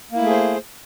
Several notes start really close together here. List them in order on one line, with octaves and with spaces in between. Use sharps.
A#3 E4 A3 G#4 C5